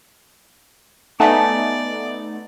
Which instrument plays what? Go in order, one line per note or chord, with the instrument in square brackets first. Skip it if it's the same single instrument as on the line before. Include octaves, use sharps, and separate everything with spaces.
[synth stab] A3 B3 D#4 [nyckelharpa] D5 [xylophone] G#5 A5